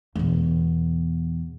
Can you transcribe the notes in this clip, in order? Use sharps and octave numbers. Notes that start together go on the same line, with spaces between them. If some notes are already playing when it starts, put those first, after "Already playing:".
E2 B2